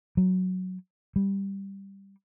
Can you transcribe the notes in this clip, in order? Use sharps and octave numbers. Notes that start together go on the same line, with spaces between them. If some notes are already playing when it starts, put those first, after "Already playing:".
F#3
G3